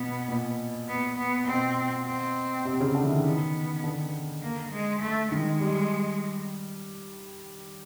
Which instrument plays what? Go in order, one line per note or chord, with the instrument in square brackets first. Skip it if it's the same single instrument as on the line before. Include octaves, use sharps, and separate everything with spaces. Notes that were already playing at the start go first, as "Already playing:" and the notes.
Already playing: [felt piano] B2 [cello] B3
[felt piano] A#2
[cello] B3
B3
[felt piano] B2 [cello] C4
[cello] C4
[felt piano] C3
C#3
D3
E3
D#3
[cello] B3
[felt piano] D3
[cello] A#3
G#3
A3
[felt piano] D#3 [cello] G#3
[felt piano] G3